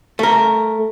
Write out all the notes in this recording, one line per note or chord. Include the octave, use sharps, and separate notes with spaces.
A3 A#4